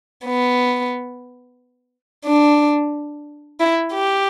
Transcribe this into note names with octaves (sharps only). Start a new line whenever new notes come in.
B3
D4
E4
G4